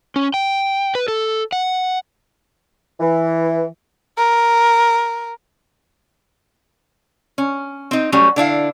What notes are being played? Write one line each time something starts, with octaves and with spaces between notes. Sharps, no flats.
C#4
G5
B4
A4
F#5
E3
A#4
C#4
C4 D#4
F#3 G3 A3 C#4
D3 D4 E4 F5